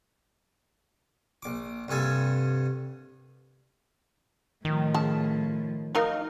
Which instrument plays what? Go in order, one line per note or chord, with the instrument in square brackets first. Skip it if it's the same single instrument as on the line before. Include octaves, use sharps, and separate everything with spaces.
[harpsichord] A#1 D6
C2 G2 A4 G#5
[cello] A2 F3 [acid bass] D#3
[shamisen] C#3 A5
[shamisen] F#3 A#4 F5 [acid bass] D#4